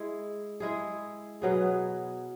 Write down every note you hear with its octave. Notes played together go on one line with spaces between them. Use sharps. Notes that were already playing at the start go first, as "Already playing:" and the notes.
Already playing: G#3 E4 G#4
G#3 E4 G#4
B2 F#3 B3 G#4